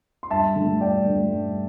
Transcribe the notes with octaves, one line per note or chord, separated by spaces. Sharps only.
C6
G2 E5 A5
D3 A3
G2 D5 G5
D3 A3
G2